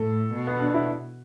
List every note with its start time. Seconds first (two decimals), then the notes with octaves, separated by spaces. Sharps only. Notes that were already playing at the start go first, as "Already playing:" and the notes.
Already playing: A2 A4
0.34 B2
0.47 B3
0.60 D4
0.74 E4